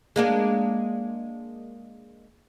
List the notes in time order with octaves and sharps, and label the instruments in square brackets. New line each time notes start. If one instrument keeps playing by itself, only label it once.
[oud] G#3 A#3 D4